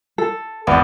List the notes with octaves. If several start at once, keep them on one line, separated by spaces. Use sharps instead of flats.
A4
G#1 E2 B3 D5 F5